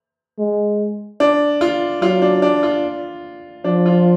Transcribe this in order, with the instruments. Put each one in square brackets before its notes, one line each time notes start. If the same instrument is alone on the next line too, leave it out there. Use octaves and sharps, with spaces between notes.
[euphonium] G#3
[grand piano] D4
F4
[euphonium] F#3 [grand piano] F4
[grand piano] D4
D4
F4
[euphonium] F3 [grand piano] D4
[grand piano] F4